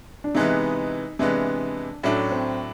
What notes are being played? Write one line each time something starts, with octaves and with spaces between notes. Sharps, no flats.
D4
C3 E3 G#3 B3 D#4
C3 E3 G#3 B3 D4
A2 F#3 A3 C#4 D4
C4